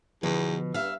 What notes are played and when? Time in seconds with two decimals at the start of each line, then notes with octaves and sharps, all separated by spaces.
0.23 E2 B2 D3 F3
0.74 G2 E5 F5